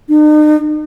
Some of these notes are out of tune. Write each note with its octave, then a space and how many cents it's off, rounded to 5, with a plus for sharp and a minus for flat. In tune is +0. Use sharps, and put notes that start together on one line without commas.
D#4 -45